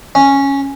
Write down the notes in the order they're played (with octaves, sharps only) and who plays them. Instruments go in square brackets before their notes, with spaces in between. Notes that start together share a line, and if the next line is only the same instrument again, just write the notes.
[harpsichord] C#4